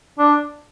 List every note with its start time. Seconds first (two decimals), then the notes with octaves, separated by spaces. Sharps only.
0.19 D4